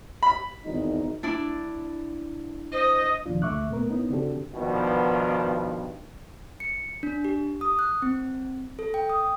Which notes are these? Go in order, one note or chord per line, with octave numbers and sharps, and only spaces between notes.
B5
G#1 E2 D#4
D4 E4 D5
C5 D#5
E2 B2 D#3 F3 D4 F4
D2 A3 E5 C#6 D6 F#6
A#2 A3 B3 A#4
B3 C#4 D#4 E4
C#3 C4 D4 F#4 G4 A4
G2 B2 D#3 F3 G3 B3
C#7
D4
G4
D#6
F#6
C4
A4
G5
D#6